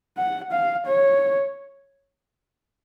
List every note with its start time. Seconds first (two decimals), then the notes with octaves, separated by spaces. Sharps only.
0.18 F#5
0.52 F5
0.86 C#5